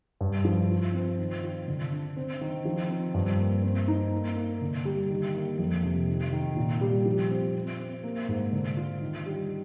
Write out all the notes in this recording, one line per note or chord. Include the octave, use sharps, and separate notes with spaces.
G2
F3
F4
C4
D#3
F4
D3
D4
C4
D#3
F3
C4
G2
A#3
C4
D#4
A#3
A#3
D3
G3
D#3
A#3
F2
C3
D#3
D#3
A#2
G3
F3
C4
C4
C4
A#3
G#2
D3
F4
D#3
G3